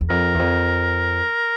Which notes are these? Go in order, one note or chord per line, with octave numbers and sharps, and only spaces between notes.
E2
F2 A#4
E2
F2